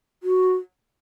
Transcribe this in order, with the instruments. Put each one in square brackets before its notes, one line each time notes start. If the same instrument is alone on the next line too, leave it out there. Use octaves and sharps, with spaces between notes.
[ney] F#4